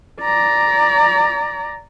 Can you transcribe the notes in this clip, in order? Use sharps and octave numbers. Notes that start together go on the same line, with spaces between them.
D5 A#5